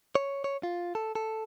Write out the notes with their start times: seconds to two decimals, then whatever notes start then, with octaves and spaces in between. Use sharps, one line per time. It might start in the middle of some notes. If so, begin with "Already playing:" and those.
0.15 C#5
0.44 C#5
0.63 F4
0.95 A4
1.15 A4